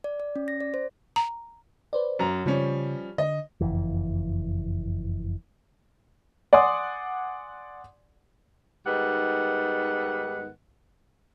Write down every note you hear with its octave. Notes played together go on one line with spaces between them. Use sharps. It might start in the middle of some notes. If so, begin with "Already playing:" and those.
D5
D5
C#4
A#6
D5
C5
A#5
B4 C5 D5
F#2 A#5
C#3 F3 G3 C#4
D3 D#5
F#1 F2 E3
D5 F#5 G#5 C6 D#6
G#2 D#3 G3 B3 F#5